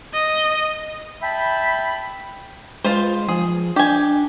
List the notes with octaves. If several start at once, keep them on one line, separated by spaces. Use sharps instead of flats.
D#5
E5 G5 A5 B5
G#3 F4 B4 C5
F3 G#4
D4 G4 G#5